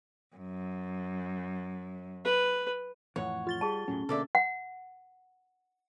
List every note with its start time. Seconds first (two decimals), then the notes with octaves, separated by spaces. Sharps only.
0.36 F#2
2.25 B4
3.16 F2 A2 E3 C#5 F#5
3.47 F4 A6 G7
3.61 G3 G#4 A5
3.88 E1 A2 F#3 C#4
4.09 B2 D3 A#3 A4 D5 E5
4.35 F#5